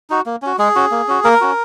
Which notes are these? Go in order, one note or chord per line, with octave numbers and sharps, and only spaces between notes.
D#4 F#4
A#3
C#4 F#4
G#3 G#4
C#4 F#4
A#3
C#4 F#4
A#3 A#4
C#4 F#4